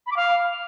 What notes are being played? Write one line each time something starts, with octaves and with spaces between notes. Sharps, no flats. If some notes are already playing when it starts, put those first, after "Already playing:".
B5
D6
F5